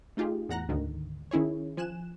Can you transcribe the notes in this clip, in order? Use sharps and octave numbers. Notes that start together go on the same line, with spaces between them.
A3 D#4 F4 G4 G#4
E2 A2 F#5 A#5 F#6 A#6
D2 G#2 D3 D#3
D#3 C#4 E4 G#4 C#5
F3 G#5 F#6 E7